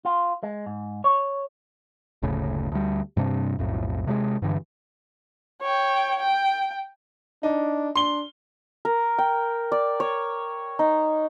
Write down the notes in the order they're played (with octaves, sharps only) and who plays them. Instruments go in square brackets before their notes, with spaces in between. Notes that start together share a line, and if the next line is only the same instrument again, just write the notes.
[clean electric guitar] F4
G#3
G#2
C#5
[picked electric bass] F#1 D2 A2 C#3
D2 G3
G2 C3 D4
B1 F2 A2
C3 F#3 G#3
G2 D3 E3
[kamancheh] C#5 G5
G5
[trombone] D4 [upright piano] D#4
[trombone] D4 [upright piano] C6 G7
[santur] A#4
G5
D5
C#5
D#4